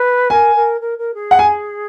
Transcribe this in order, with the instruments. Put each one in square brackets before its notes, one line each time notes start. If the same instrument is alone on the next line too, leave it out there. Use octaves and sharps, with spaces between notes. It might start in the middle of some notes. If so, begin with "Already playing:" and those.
Already playing: [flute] B4
[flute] A#4 [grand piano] G#5
[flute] A#4
A#4
A#4
G#4
[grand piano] F#5
G#5